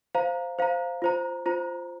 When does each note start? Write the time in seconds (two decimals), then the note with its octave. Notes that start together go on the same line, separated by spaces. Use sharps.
0.15 C5 F5 A#5
0.59 C5 F5 A#5
1.02 F4 C5 A#5
1.46 F4 C5 A#5